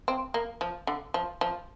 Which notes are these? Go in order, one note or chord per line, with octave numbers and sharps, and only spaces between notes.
C4
A#3
F3
D3
F3
F3